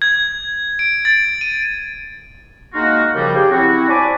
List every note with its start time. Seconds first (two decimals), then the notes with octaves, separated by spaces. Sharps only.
0.02 G#6
0.79 D7
1.05 A6
1.41 D#7
2.74 G#3 A#3 D#4 F4 F#4
3.14 F#2 C#3 F3 G3
3.36 G4 G#4 G5
3.51 F#3 C4 E4 F#4
3.88 C5 D5 G#5 A5 B5 D6